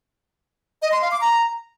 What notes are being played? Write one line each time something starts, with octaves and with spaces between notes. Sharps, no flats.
D#5
C6
F5
D6
A#5